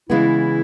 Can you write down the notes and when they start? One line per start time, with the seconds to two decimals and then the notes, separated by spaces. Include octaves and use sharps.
0.09 C#3 E3 G#3 B3 E4